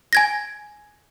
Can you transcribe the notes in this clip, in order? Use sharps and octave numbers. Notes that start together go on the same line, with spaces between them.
G#5 G#6 A#6